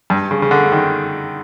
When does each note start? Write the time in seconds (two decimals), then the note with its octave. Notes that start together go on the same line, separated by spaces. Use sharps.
0.10 G2
0.31 C#3
0.42 C#3
0.51 D3
0.72 D#3